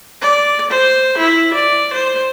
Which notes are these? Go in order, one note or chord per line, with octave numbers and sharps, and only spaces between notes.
D5
C5
E4
D5
C5